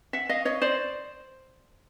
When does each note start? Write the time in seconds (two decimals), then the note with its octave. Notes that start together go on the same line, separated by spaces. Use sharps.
0.13 E5 F#5
0.29 D#5 F5
0.45 C#5 D#5
0.62 C5 D5